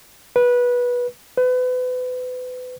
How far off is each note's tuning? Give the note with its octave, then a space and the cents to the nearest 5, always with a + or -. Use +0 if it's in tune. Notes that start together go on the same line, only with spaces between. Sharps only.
B4 -20
B4 +30